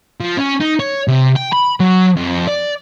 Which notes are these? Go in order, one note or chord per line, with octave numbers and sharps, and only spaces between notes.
F3
C#4
D#4
C#5
C3
G5
B5
F#3
F2
D5